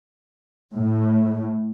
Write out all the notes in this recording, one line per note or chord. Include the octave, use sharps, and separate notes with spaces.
A2